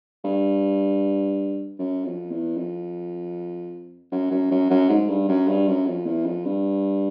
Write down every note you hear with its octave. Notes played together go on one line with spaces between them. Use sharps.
G2
F#2
F2
E2
F2
F#2
F#2
F#2
F#2
G#2
G2
F#2
G2
F#2
F2
E2
F2
G2